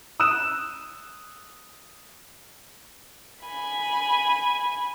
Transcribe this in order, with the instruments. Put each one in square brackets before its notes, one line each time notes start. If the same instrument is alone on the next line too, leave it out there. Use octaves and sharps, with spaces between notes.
[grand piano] D#6 E6 F#6 E7
[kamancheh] G#5 B5